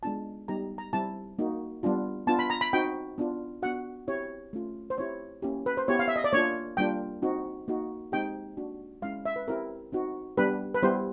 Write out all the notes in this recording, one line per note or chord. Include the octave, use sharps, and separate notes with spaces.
G#3 B3 D4 F4 A5
G3 B3 D#4 G4 A#5
A#5
G3 C4 E4 A5
A#3 D#4 F#4
G3 B3 D4 F4
B3 D4 F4 A5
B5
A#5
B5
C4 D#4 F#4 G5
B3 D4 F4
B3 D4 F#4 F#5
C4 E4 G4 C#5
A3 C#4 F4
C5
C4 E4 G4 C#5
A#3 C#4 E4 G4
B4
C5
B3 E4 G4 C#5
F5
E5
D#5
D5
A#3 D4 F4 C#5
G3 A#3 D4 F4 G5
C4 D#4 F#4
A#3 D#4 F#4
G#3 C4 D#4 G4 G5
A#3 D4 F#4
G#3 C#4 E4 F5
E5
B4
C4 E4 G4 A#4
C4 D#4 F#4
G3 B3 D4 G4 B4
B4
G3 B3 E4 G4 C5